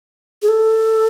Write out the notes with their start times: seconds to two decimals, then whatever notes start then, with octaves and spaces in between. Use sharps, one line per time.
0.42 G#4
0.48 A4